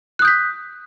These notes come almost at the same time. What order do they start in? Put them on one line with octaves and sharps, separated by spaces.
F#6 D#6 G6 B6